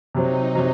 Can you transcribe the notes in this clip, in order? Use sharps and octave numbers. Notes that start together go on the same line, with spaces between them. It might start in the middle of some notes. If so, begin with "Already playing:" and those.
C3 F#3 C4 D#4
C3 F#3 C4